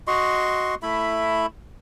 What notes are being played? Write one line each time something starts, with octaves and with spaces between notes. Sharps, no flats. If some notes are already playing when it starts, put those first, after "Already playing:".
F#4 D#5 C6 C#6
A3 E4 E5 B5